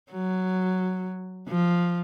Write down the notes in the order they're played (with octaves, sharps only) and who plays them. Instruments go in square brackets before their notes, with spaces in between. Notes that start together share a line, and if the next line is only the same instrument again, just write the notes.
[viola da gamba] F#3
F3